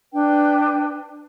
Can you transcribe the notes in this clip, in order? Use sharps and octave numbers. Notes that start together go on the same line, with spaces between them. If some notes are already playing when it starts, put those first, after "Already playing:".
D4 B4 G5